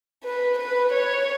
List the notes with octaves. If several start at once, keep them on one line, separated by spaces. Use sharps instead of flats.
B4
B4
C#5